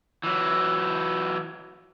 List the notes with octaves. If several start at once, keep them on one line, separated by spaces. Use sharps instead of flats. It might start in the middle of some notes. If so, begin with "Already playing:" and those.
E3 F#3